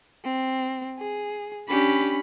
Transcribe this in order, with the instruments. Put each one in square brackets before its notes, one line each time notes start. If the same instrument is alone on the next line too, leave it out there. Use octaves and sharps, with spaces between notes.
[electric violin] C4
G#4
[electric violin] C#4 B5 [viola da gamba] D4 G4